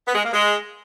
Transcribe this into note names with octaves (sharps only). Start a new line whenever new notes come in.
B3
G#3
A#3
G#3